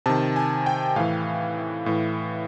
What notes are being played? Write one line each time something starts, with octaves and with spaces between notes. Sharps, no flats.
C3 D#3 A5
G#5
G5
A2 E3 F5
A2 E3